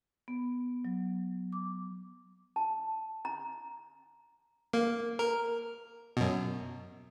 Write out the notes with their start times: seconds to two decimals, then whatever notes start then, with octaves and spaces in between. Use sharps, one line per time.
0.28 B3
0.85 F#3
1.53 D6
2.56 A5
3.25 A#5
4.73 A#3
5.19 A#4
6.17 F#2 B2